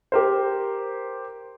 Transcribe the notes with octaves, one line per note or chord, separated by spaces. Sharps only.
G4 A#4 C5